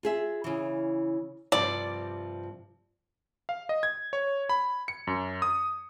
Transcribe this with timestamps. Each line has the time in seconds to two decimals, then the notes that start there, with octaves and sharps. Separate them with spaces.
0.03 F4 G#4 E5
0.44 C#3 E3
1.52 G2 C3 F3 D5
3.49 F5
3.69 D#5
3.83 G#6
4.13 C#5
4.49 B5
4.88 C#7
5.07 F#2
5.42 D#6